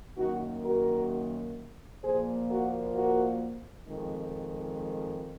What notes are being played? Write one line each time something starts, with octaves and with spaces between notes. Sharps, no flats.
F#2 D#3 A#3 D#4 F#4
F#4 A#4
A#2 F3 A#3 G#4 C5
F#4 A#4
F#4 A#4
F2 D#3 G#3